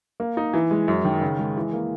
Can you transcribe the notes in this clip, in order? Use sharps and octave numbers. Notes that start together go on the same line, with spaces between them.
A#3
D#4
E3
G#3
F#2
D#3
C#3
G#3
E3
A#3